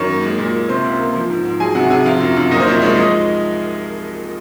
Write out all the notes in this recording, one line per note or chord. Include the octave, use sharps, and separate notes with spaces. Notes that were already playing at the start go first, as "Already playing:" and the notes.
Already playing: F#2 D#3 C#5 C#6
A#3
G#3
A#2
A#2
C3 C5 C6
C#2
A#3
F3
G#2
G#2
F#3 G#4 G#5
C3 F#4 F#5
C3 G#4 G#5
F3 F4 F5
F#2
F#2
A#2 D#4 D#5
C5
C2 C#5
G#3 C#5
F3 D#4 D#5